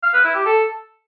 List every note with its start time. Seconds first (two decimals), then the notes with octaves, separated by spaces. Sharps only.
0.03 F5
0.14 B4
0.24 E4
0.35 G4
0.46 A4